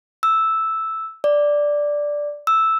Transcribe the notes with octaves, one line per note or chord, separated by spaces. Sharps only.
E6
D5
E6